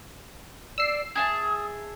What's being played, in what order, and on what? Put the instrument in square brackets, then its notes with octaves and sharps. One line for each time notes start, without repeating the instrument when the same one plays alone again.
[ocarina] D5 [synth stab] E6 C7
[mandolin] G#4 E5 A5 [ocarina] D#6